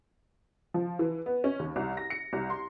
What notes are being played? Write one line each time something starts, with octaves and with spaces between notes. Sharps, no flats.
F3
E3
B3
C#4
D#2
C2
A#6
C#7
C2
C6